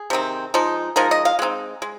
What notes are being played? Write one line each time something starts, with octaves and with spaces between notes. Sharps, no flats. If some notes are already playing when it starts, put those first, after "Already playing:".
Already playing: G#4
C3 D#3 C4
F3 G#3 D#4
F3 G#3 D#4 A#4
D#5
F5
G#3 C4 D#4
G#3